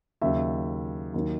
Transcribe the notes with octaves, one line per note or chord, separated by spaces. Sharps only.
D#2 C#3 F#3 E5
D#2 D#3 F#3